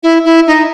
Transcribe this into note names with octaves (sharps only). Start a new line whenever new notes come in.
E4
E4
D#4